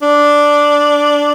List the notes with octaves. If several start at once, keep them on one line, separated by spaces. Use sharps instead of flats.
D4